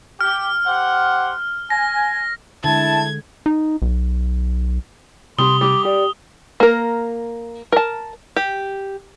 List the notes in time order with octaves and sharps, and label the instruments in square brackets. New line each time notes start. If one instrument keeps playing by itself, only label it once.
[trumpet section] G4 [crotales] F6
[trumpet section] G4 C5 F#5
[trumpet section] G#5 [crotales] A#6
[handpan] D3 G#3 [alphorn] E4 [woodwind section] A5 [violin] G#6
[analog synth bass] D#4
B1
[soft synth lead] C3 [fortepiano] G3 [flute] C6 [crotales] D#6 G7
[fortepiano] G3 [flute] D6
[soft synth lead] G4 [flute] D5
[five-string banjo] A#3 A#4
A#4 A5
G4